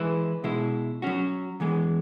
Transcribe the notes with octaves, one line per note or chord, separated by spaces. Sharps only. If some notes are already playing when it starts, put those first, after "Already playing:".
Already playing: E3 G#3 E4 B4
B2 G#3 E4
F#3 C#4 F#4
E2 E3 G#3